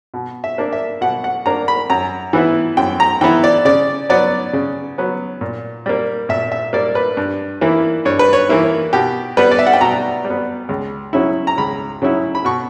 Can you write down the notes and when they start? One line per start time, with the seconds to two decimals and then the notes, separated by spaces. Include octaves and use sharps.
0.14 B2
0.44 E5
0.58 A#3 D4
0.73 E5
1.01 B2 F#5
1.24 F#5
1.46 A#3 D4 A#5
1.68 B5
1.90 F#2 A#5
2.33 E3 B3 E4
2.77 F#2 G5
3.00 A#5
3.21 E3 B3 E4 G5
3.44 D5
3.65 C#3 D5
4.09 F#3 B3 D5
4.53 C#3
4.98 F#3 B3
5.41 A#2
5.86 G3 A#3
6.29 A#2 E5
6.52 E5
6.73 G3 A#3 D5
6.95 B4
7.17 G2
7.61 E3 A#3 E4
8.05 G2 C#5
8.19 B4
8.33 C#5
8.49 E3 A#3 E4
8.93 B2 G4
9.37 G3 B3 B4
9.51 D5
9.59 E5
9.66 F#5
9.73 G5
9.81 B2 A#5
10.25 G3
10.30 B3
10.69 C#2
11.13 C#3 F#3 C#4 E4
11.47 A#5
11.58 C#2 B5
12.02 C#3 F#3 C#4 E4
12.35 B5
12.45 B2 C#6